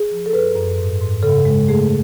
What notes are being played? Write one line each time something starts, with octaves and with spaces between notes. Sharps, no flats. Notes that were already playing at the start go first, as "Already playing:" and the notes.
Already playing: G#4
F3
A4
F#2 B4
F#2
G#2
G#2
C#3 A4
G#3
A3 G#4